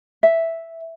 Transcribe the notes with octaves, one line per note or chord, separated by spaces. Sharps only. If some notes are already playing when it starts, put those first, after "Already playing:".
E5